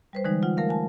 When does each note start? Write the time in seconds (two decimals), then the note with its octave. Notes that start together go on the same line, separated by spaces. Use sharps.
0.13 G3 B4 C5
0.24 D3 E3 G3 G#3 D#4
0.43 F4 F#5
0.57 A3 A#4 F5
0.69 G#5 A5